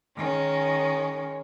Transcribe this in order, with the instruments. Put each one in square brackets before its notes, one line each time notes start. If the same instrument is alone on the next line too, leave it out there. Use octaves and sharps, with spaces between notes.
[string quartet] D#3 G#3 C#4